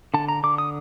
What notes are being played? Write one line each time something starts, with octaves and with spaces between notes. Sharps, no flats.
D3 A5
A#5
D3 D6
D#6